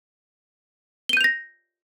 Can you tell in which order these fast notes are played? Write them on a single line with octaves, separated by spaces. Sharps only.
G7 D#7 G6 F7 A#6